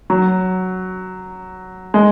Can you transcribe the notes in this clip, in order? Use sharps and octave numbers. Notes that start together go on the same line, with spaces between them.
F#3
G#3